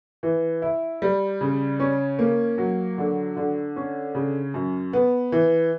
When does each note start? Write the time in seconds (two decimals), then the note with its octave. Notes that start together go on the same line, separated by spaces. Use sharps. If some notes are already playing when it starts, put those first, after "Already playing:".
0.23 E3
0.62 E4
1.02 G3
1.41 C#3
1.80 C#4
2.19 A#3
2.58 F#3
2.98 D3
3.37 D3
3.76 C#4
4.15 C#3
4.54 F#2
4.93 B3
5.32 E3